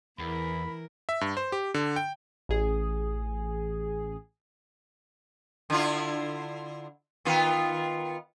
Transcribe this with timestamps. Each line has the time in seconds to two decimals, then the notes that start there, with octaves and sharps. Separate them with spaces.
0.19 E2 E3 A#4 B5
1.09 E5
1.21 G2
1.37 C5
1.52 G4
1.74 D3
1.96 G5
2.49 A1 G#4
5.70 D3 E4 F4
7.25 D#3 B3 F4